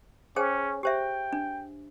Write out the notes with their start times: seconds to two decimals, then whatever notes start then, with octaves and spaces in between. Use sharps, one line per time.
0.36 C#4 G#4 C5 G5
0.83 G4 C5 E5 G5
1.33 D4